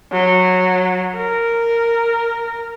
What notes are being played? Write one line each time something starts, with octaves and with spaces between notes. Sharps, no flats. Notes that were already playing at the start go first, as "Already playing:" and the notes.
F#3
A#4